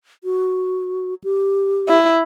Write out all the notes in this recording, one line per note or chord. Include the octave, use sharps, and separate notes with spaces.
F#4
G4
E4